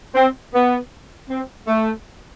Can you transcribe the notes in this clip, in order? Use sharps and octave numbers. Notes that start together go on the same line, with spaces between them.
C4
B3
C4
A3